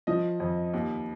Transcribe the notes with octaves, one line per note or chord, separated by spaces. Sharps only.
F3 D#5
F2
D#2